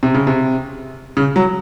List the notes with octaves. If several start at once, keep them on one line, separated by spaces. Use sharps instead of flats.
C3
C#3
C3
C#3
F#3